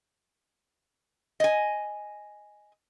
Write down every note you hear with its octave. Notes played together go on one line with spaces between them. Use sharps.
D#5 G#5